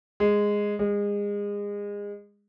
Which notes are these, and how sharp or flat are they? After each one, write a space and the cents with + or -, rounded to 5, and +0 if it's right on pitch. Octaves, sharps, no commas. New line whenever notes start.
G#3 -10
G#3 -30